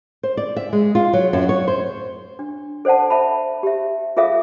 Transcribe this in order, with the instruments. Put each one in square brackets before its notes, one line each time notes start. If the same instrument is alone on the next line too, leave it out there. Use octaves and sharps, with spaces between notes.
[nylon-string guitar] C5
D5
E5
G#3
F4
F#3
F#2
C#5
C5
[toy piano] D4
A4 C5 D5 F#5 A5
E5 A5 B5
G4 E5
F4 G#4 A4 E5 F5 D#6